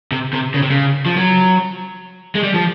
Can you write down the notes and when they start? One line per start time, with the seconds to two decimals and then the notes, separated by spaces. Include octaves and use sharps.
0.12 C3
0.33 C3
0.54 C#3
0.62 C3
0.71 C#3
1.06 F3
1.17 F#3
2.35 G#3
2.43 G3
2.54 F3